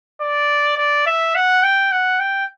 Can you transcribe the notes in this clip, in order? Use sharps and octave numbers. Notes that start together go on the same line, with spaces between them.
D5
D5
E5
F#5
G5
F#5
G5